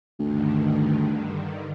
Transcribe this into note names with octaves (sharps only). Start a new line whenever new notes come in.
D2 G2 D3 D#3